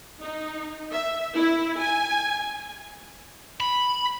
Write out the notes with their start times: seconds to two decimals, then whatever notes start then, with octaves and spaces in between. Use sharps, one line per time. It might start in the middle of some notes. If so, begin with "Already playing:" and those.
0.21 D#4
0.92 E5
1.35 E4
1.81 G#5
3.60 B5